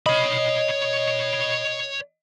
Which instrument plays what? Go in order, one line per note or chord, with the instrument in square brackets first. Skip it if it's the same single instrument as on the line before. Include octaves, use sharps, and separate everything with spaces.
[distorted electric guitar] C#5 B5 [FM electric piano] D#5